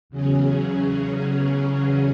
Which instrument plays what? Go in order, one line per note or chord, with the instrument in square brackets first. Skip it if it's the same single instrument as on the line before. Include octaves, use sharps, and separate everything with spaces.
[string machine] E2 C#3 F#3 C#4 G#4